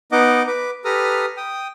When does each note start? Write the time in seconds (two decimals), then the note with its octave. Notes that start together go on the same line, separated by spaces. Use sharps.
0.12 B3 D#4 D#5 F#5 D6
0.47 B4 D6
0.85 G4 A4 B4 A#5 D#6 F6
1.37 G5 D#6